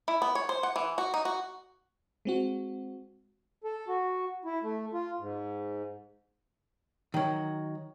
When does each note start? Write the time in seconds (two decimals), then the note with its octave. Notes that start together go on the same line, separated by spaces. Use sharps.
0.08 E4
0.22 B3
0.35 C#5
0.49 C5
0.63 F#5
0.76 E3
0.98 F#4
1.14 D#4
1.25 F#4
2.25 G#3 C4 F#4
3.64 A4
3.88 F#4
4.45 E4
4.63 A3
4.93 F4
5.19 G#2
7.14 D#3 F#3